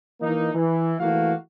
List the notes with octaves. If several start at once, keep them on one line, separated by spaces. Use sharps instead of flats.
E3 A#3 D#4
E3
E3 A3 A#3 F#4 F5